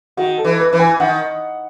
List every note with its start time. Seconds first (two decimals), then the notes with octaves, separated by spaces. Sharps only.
0.17 D#3 F#4
0.38 A4
0.44 E3
0.59 B4
0.73 E3
0.79 G#5
1.00 D#3 F#5